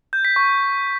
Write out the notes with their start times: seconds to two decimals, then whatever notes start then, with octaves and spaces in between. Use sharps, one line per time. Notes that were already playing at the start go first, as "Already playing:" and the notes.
0.13 G6
0.25 B6
0.36 C#6